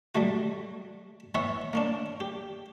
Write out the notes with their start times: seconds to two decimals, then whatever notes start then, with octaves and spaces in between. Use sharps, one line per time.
0.15 F#3 G3 A3 F#4
1.35 E3 B3 C#5 E5 F#5
1.73 A#3 C#4 D4
2.20 G4